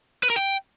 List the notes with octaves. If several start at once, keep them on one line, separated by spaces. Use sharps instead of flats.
B4
A#4
G5